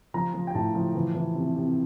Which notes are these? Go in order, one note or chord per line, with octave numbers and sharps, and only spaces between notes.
F3 A#5
F3
G5
A2 A5
F3
E3
E3
C3
C3